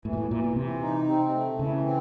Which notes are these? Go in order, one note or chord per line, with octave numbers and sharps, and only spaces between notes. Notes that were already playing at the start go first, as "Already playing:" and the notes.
A2 E3
A#2
A2
A#2 E3
A#2
C3 E3
D#4
C4
A3
C#3 E3
C4